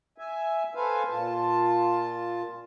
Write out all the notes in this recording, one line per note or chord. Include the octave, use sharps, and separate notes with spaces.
E5 G#5
A4 B4 C5 F5 G#5
A#2 F4 A5